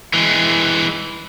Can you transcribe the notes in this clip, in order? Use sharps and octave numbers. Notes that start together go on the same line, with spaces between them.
E3 G#3